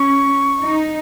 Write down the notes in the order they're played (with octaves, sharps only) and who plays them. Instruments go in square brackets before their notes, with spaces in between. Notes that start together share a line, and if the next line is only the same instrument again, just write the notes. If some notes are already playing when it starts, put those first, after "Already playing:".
Already playing: [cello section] C#4 [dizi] C#6
[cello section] D#4